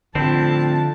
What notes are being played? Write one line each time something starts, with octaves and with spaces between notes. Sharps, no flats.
F2 A2 D3 C4 E4 A5